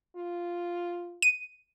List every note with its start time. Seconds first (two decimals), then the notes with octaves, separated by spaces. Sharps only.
0.16 F4
1.22 D#7